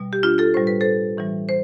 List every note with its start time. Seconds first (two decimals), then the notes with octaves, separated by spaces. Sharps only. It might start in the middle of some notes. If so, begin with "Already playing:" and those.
Already playing: B2 G3
0.13 G4
0.23 D4 F4
0.38 F4 A4
0.54 A2 G3 C5
0.67 B4
0.81 A4 C5
1.17 A2 E3 G3
1.49 C5